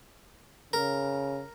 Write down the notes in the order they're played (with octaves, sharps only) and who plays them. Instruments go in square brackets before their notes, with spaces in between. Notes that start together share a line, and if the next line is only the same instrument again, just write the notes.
[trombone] C#3 [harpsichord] A#4